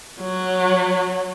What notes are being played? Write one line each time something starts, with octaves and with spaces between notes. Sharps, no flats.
F#3